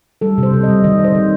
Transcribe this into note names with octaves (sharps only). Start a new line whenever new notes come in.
G3 A4
C3
C5
C3
D#5
G3
D#3 D#5
C3
C5
D#3